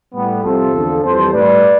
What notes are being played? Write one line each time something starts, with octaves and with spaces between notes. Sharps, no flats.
A2 G3 B3
C2 C3 F3 F4 A4
E2 D3 F3
F2 E3 G3 A4 C5
A2 G3 B4 D5